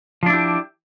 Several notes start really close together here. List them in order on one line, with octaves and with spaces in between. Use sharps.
F3 D4 E4 G4